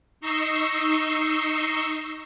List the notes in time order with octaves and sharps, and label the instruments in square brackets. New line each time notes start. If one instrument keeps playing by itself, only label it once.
[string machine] D#4 D#5 C#6 E6 C7